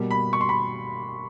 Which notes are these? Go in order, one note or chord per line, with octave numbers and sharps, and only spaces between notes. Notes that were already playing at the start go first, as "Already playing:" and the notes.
Already playing: B2 G3 A#3
B5
C#6
C6
B5